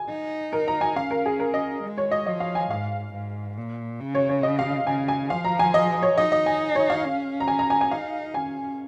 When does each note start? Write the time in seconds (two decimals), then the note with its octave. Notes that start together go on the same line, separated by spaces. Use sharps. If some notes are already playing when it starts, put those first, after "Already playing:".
Already playing: G#5
0.09 D#4
0.53 A#4
0.68 A#5
0.81 G#5
0.96 C#4 F5
1.11 A#4
1.26 G#4
1.40 A#4
1.54 D#5
1.83 G#3
1.98 C#5
2.11 D#5
2.26 F3 D#5
2.40 F5
2.55 G#5
2.70 G#2 F5
3.13 G#2
3.57 A#2
4.00 C#3
4.15 C#5
4.29 C#5
4.43 D#5
4.59 F5
4.87 C#3 G#5
5.08 G#5
5.30 F3 F5
5.45 A#5
5.59 G#5
5.74 D#5
6.03 C#5
6.17 D#4 D#5
6.32 D#5
6.46 G#5
6.75 C#5
6.90 F5
7.05 C#4
7.40 A#5
7.48 G#5
7.59 A#5
7.70 G#5
7.81 G#5
7.91 D#4 F5
8.34 C#4 G#5